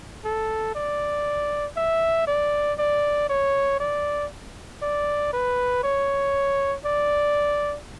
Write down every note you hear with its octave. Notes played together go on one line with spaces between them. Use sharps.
A4
D5
E5
D5
D5
C#5
D5
D5
B4
C#5
D5